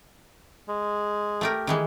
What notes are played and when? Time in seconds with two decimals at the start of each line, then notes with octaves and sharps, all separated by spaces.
0.68 G#3
1.41 A3 G4 A#4
1.67 D#3 E3 G#3